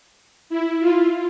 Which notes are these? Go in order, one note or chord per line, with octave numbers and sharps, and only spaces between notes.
E4
F4